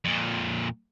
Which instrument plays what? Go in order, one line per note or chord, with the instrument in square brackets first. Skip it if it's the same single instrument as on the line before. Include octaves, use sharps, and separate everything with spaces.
[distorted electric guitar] F2 A#2